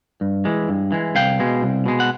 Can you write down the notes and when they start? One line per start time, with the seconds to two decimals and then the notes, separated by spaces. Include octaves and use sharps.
0.21 G2
0.45 E3 G#3
0.69 G2
0.92 E3 G#3
1.15 C2 F5 G5
1.40 B2 G#3
1.63 C2
1.86 B2 G#3
2.00 F#5